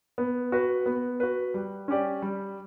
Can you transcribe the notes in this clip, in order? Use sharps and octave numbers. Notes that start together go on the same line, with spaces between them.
B3
F#4 B4
B3
F#4 B4
G3
C#4 G4 D5
G3